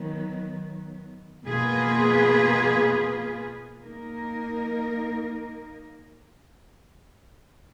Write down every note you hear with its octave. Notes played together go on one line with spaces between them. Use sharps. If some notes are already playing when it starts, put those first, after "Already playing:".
Already playing: D#3 F#3 B3
B2 A#3 F4 G#4 B4
A#3 D#4 A#4